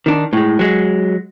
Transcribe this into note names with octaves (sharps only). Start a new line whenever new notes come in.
D#3 D4
A2 G#3
F#3 G#3